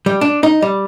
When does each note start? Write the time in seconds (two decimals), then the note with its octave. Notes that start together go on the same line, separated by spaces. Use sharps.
0.06 G3
0.21 D4
0.43 D#4
0.62 G3